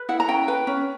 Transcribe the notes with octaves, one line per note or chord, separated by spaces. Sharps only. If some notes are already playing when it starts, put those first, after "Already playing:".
Already playing: B4
E4 F#5
A#5
C#4 G5
B4 G5
C#4